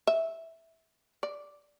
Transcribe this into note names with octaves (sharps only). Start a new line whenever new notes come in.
E5
D5